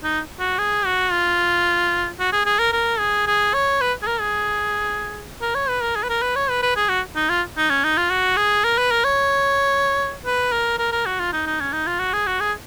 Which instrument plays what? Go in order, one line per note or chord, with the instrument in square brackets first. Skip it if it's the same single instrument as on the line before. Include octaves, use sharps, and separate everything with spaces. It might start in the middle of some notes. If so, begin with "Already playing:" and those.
[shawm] D#4
F#4
G#4
F#4
F4
F#4
G#4
G#4
A#4
A#4
G#4
G#4
C#5
B4
G#4
A#4
G#4
A#4
C#5
B4
A#4
G#4
B4
A#4
B4
C#5
B4
B4
G#4
F#4
D#4
F4
D#4
C#4
D#4
F4
F#4
G#4
A#4
B4
A#4
C#5
B4
A#4
A#4
A#4
F#4
F4
D#4
D#4
C#4
D#4
F4
F#4
G#4
F#4
G#4